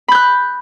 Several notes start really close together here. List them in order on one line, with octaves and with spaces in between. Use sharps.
B5 G6 F#6